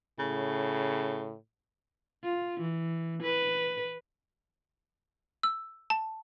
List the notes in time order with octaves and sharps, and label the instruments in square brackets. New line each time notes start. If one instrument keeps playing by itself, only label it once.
[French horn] A2 [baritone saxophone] C#3
[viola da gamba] F4
E3
B4
[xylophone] E6
A5